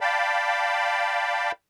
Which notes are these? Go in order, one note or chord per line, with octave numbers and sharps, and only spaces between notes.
D5 F5 G5 A5 B5